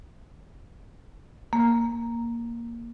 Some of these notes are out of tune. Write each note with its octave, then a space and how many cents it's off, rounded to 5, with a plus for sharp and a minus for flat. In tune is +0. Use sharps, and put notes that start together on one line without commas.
A#3 +0